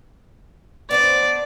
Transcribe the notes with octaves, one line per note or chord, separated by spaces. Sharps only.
B3 D4 C5 D5